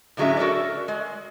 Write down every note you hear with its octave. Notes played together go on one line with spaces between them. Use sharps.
A2 D3 F#3 G#3 C#4 E5
F#4 A4 A#4 C#5 D5
G#3